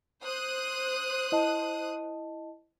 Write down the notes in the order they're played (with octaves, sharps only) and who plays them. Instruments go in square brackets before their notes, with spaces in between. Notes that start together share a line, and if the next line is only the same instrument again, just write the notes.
[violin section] C5 D#6 F#6
[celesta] E4 D#5 A5